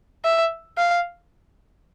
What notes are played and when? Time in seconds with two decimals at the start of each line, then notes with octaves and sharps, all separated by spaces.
0.25 E5
0.78 F5